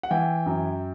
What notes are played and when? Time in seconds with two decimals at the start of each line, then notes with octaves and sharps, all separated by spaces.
0.03 F#5
0.11 E3 G5
0.46 F#2